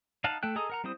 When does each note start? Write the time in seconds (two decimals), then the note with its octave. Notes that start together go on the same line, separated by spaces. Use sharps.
0.24 D#4 F5 F#5 A5
0.43 A3 A4 G5 F#6
0.56 G#4 A4 D#5 A#5 D#6
0.70 A#4 F#5 A#5
0.84 G3 C4 E4 C5 D#6